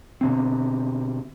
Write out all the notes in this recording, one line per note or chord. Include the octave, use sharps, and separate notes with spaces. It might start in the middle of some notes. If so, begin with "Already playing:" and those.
B2 D3 C4